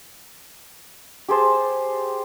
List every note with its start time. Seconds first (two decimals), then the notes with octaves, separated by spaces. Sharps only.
1.29 G4 G#4 C5 A5